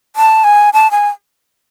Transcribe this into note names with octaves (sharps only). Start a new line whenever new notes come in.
A5
G#5
A5
G#5